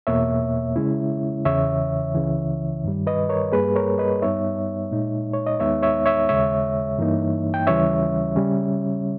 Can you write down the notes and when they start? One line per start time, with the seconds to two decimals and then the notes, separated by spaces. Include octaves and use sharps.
0.07 E2 B2 A#3 C#5 E5
0.76 C#3 G#3 C#4 E4
1.45 E2 C#3 E3 C#5 E5
2.14 C#2 C#3 E3
2.84 G2 D#3 G3
3.07 B4 D#5
3.29 A#4 C#5
3.52 G2 G3 A#3 G#4 B4
3.76 A#4 C#5
3.98 B4 D#5
4.22 G2 G3 B3 D#4 C#5 E5
4.91 A#2 G#3 D#4
5.34 C#5
5.47 D#5
5.60 D#2 D#3 G#3 B3 D#4 C#5 E5
5.83 C#5 E5
6.06 C#5 E5
6.29 D#2 C#3 G#3 C#5 E5
6.98 G2 E3 A#3 D#4
7.54 G5
7.67 D#2 C#3 E3 G3 C#4 C#5 E5
8.36 C#3 G3 C#4